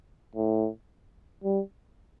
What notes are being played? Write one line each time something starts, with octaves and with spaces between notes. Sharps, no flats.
A2
G3